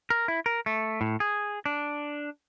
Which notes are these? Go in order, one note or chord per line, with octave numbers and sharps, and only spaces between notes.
A#4
E4
A#4
A3
A2
G#4
D4